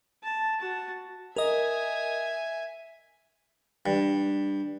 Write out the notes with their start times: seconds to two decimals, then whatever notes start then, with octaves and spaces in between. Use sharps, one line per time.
0.23 A5
0.59 F#4 A5
1.36 A#4 D#5 E5 G#5
3.86 G2